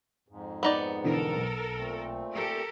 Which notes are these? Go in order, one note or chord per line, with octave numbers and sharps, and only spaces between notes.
F2 G#2
B3 D#4 D5
B2 D3 E3 A4 A#4
B1
A#2 A3 C4
G4 A4 A#4